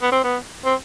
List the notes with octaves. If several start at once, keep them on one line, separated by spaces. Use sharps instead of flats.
B3
C4
B3
C4